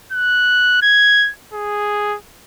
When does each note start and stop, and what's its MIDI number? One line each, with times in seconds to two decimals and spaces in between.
0.12 0.81 90
0.82 1.31 92
1.53 2.16 68